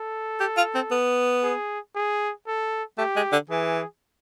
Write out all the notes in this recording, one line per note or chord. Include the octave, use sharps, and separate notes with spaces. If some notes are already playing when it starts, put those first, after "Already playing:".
Already playing: A4
G4
F4
C4
B3
G#4
G#4
A4
A3 G4
G#3
D3
E3 G#4